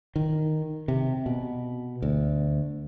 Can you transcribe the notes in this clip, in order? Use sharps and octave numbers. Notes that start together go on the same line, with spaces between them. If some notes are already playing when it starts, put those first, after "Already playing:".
D#3
C3
B2
D2